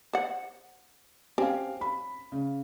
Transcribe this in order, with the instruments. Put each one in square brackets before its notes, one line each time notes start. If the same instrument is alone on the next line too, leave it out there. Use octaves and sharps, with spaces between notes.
[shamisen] C5 F#5
[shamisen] C4 C#4 [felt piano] G4 F5
[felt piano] B5
C#3